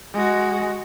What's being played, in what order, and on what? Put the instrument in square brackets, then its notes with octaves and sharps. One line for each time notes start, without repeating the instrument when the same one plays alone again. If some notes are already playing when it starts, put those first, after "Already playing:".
[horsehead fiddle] G#3 F#4